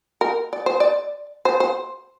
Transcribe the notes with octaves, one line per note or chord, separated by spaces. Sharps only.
A#4
D5
C5
D5
C5
C5